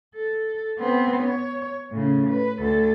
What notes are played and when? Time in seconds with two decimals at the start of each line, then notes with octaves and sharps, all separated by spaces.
0.15 A4
0.79 B3 C4
1.23 C#5
1.91 A2 C#3
2.30 B4
2.59 D2 A4